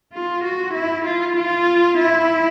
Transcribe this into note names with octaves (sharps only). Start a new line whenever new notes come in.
F4
F#4
E4
F4
F4
E4